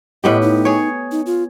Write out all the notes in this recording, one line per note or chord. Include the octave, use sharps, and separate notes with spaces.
A2 B3 G4 D#5
D#4
G#4 C#5
D#4
F4